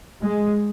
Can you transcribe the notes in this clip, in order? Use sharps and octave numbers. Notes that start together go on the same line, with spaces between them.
G#3